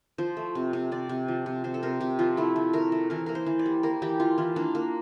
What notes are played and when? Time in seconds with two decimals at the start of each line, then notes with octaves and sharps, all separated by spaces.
0.18 F3 C5
0.37 A3
0.55 C3
0.73 C3
0.92 C3 D5
1.09 C3
1.28 F3
1.46 C3
1.64 C3 C5
1.74 A4
1.83 C3 A#4
2.01 C3 G4
2.19 F3 F4
2.37 A3 E4
2.56 A3
2.73 A3 A#4
2.92 A3
3.10 E3 A#4
3.26 A#3 A#4
3.35 C5
3.46 E3
3.59 D5
3.66 G3
3.83 A#3 A#4
4.02 E3 G4
4.20 E3 F4
4.38 E3 F4
4.56 A#3 D4
4.75 A#3